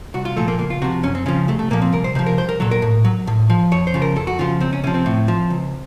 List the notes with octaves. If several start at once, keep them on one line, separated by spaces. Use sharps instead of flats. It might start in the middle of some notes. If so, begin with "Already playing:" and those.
C2 F#4
F4
A#2 F3 A3
A#3
C#2 A#3
F4
C3 F3 F#4
F#2 C#4
C4
C#3 F3 C#4
C2 A3
A3
A#2 F3 A#3
C4
C2 A#4
C5
C3 F3 C5
A#4
C2 C5
A#4
A#2 F#3 A4
A#4
A2
F#3
A2
F3
F2 C#5
C5
C#3 F3
A#4
F2 A4
F#4
C#3 F3 F4
C#2 C4
C#4
C3 F3 C#4
C4
A2
F3
C#2